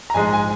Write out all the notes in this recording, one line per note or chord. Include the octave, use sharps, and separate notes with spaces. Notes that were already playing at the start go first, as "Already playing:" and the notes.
A#5
A#1 G#2 G#3 G#5
G#5